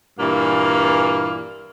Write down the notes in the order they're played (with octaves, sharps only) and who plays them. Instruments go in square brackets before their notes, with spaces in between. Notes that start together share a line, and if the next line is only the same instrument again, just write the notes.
[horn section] G2 A#2 E3 A#3 F5